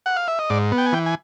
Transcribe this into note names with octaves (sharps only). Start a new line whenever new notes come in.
F#5
F5
E5
D#5
G#2 D5
B3
G5
G#5
E3 G5
G#5